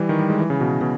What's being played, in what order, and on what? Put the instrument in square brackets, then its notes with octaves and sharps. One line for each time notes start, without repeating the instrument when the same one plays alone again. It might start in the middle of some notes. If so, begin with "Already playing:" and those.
Already playing: [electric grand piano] E3 G3
D#3
G3
G#3
E3
C#3
B2
B2